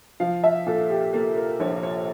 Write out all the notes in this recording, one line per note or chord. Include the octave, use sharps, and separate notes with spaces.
F3 F5
E5
A#2 A4
G4
A#3 A4
A#4
A#1 C#5
C#5